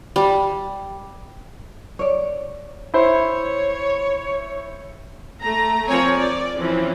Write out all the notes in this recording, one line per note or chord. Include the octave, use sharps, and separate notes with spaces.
G3
C#5 D5
E4 C5 C#5 E5
A3 A#5
F3 C4 A#4 C#5 G#5
D5
E3 F3 C4 C#4